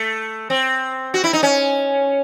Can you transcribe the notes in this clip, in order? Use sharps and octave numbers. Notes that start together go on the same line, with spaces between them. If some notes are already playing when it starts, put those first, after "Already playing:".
Already playing: A3
C4
F#4
E4
D#4
C#4